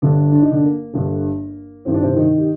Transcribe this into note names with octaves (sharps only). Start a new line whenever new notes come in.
G1 G2 D3 D4
D4
D#4
D3 D4
A#3
G1 G2 D3
A1 G2 D#3 C4
D4
C3 C4
D#3 D#4
G4